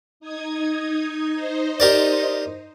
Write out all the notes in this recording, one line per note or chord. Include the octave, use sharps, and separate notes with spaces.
D#4 D#6 G#6
D#4 C5 D#5
G4 A#4 D5